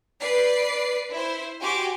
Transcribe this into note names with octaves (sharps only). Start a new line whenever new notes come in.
B4 D5 C7
E4 C5
F#4 G4 G#5 C6 D6